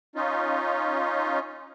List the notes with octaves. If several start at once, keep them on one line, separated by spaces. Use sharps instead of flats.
C#4 D#4 F4